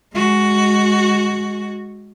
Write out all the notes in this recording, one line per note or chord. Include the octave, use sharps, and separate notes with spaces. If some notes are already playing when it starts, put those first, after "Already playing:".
G#3 F#4